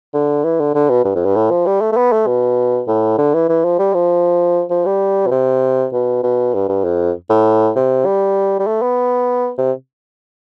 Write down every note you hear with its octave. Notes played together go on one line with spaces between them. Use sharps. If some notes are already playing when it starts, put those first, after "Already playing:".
D3
E3
D3
D3
B2
G2
F2
G2
A2
F3
G3
A3
A3
B3
A3
B2
A2
D3
E3
E3
F3
G3
F3
F3
G3
B2
C3
B2
B2
G2
G2
F2
A2
C3
G3
G3
A3
B3
C3